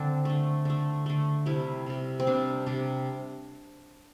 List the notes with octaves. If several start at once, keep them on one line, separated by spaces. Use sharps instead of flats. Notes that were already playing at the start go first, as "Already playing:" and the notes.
Already playing: D3 C4 D4
D3 A3
D3 A3
D3 A3
C3 G3 E4
C3 G3
C4
C3 G3 D4
C3 G3 D4